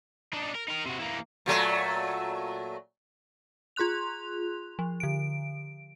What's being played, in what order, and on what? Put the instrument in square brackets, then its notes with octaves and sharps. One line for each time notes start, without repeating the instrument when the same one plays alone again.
[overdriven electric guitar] D4 D#4
A#4
D#4 A#4
C3 F#4
E3 A#3
[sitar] A#2 F#3 A3
[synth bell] F4 G#4 C6 F#6 F7
F3
D3 D7